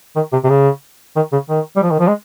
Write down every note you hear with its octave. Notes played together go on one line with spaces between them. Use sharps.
D#3
C3
C3
C#3
D#3
C#3
D#3
G3
F3
D#3
F3
G#3